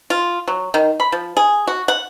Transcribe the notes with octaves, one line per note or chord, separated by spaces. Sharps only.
F4
F#3
D#3
B5
F3
G#4
F#4
F#5